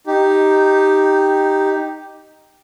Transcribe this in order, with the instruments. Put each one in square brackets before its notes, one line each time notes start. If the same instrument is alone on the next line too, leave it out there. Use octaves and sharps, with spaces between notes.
[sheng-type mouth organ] D#4 G4